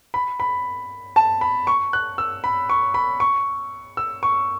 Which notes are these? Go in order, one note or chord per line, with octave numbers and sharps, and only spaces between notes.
B5
B5
A5
B5
C#6
F#6
E6
B5
C#6
B5
C#6
E6
C#6